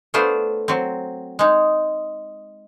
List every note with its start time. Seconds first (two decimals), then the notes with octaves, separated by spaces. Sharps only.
0.14 A3 B3 D4 F4 C5
0.68 F#3 C4
1.39 G#3 D#4